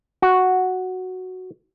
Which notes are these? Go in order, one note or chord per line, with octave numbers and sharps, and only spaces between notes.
F#4